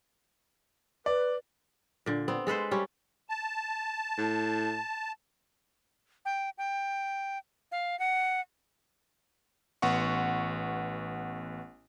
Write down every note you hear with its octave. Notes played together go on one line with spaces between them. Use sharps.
B4 D5
A#2 D3
B3 C4
G#3 A4 B4 C5
G3 C#4
A5
A2
G5
G5
F5
F#5
A1 B3 F#5 C6 C#6